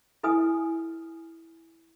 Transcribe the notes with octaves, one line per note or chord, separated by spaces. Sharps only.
E4 A4 B4 G#5 D#6